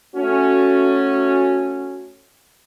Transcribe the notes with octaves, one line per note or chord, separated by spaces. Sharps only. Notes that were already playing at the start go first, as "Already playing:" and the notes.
A3 C#4 F#4